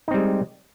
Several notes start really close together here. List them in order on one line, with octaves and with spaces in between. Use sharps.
D#4 C4 G3 G#3